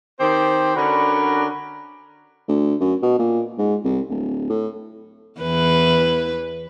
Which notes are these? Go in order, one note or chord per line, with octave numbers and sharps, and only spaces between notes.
D#3 C4 G4 C5
D3 C#4 D4 F#4 A#4 B5
D2
F#2
B2
A#2
G#2
C2
D1
A2
E2 E3 B4